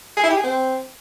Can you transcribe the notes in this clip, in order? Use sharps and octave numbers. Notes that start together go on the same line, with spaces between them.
G#4
E4
G4
G#4
C4